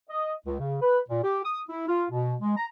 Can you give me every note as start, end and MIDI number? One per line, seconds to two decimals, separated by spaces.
0.10 0.33 75
0.46 0.56 37
0.60 0.76 49
0.82 0.99 71
1.09 1.21 46
1.23 1.39 67
1.44 1.60 87
1.69 1.88 64
1.88 2.05 65
2.11 2.36 47
2.41 2.56 56
2.57 2.66 82